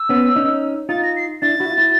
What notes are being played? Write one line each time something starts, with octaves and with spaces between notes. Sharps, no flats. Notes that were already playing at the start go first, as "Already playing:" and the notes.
Already playing: E6
B3 C#4
C#4 D#4
D#4 F4 A6
A#6
C7
D4 E4 A6
E4 F#4
F4
E4 F#4